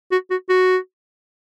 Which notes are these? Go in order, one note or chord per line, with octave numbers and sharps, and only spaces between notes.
F#4
F#4
F#4